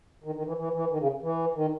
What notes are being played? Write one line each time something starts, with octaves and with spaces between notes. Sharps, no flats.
D#3
D#3
E3
E3
E3
D#3
C#3
E3
D#3